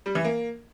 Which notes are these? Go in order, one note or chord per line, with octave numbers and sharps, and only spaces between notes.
G3
E3
A#3